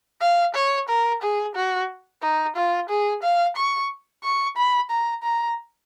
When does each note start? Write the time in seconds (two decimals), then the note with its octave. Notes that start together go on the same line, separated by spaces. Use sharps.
0.21 F5
0.55 C#5
0.89 A#4
1.22 G#4
1.55 F#4
2.22 D#4
2.56 F4
2.89 G#4
3.23 F5
3.56 C#6
4.24 C#6
4.56 B5
4.90 A#5
5.23 A#5